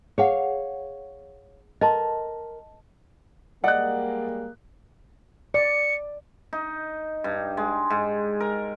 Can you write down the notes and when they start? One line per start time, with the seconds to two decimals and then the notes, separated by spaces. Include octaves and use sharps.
0.18 G#4 C#5 F5 F#5
1.81 A#4 D#5 A5 C6
3.64 G3 G#3 A#3 D5 D#5 F#5 F#6
5.54 D5 C#7
6.53 D#4
7.24 G2
7.57 G#3
7.90 G#2
8.40 A#4